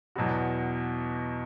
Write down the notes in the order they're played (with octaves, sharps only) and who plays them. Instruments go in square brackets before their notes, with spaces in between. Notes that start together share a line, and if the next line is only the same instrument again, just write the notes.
[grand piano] E2 B2 F#3 B3 F#4